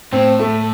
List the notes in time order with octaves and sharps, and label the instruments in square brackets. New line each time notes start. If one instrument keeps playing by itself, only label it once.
[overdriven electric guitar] A2 [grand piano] C4
[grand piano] A3